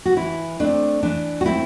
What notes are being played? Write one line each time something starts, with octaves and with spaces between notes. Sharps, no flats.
F#4
E3 E4
A3 C4 D4
E3 D4
F#4
A3 C4 E4